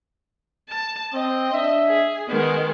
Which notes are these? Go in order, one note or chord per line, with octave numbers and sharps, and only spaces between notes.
A5
C4 D#5
D4 E5
G#4
D#3 G#3 B3